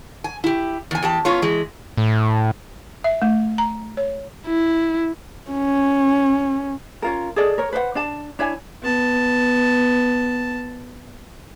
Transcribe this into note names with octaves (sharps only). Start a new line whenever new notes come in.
G#5
E4 G4
E2 G#5
E2 G4 A5
B3 C#4 F4 C#5
E3 G#3
A2
E5
A3
A#5
C#5
E4
C#4
C#4 F4 A#4
G#4 A4 D5 D#5
A#4 C#5
B4 C5 D5 F#5
D4 D5 A5
D4 E4 C#5 G#5
B3 A5